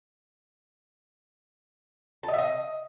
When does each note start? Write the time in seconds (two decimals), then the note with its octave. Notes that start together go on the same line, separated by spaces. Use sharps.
2.23 A5
2.28 D#5
2.33 E5
2.39 D#5